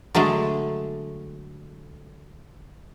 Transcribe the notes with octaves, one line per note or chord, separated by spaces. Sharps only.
D3 F#3 G#3 A3